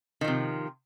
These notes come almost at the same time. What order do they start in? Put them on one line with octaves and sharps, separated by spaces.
D#3 F3 C3